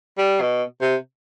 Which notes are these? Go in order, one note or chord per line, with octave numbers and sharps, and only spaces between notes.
G3
B2
C3